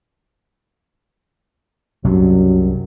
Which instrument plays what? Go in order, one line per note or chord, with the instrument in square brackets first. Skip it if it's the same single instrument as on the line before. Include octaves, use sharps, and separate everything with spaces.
[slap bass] C2 C3 F#3 [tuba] F#2